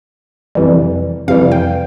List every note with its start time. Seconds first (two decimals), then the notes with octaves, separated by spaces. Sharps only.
0.55 F2 C3 E3 G3
1.28 F2 C3 E3 G3 F5
1.52 G5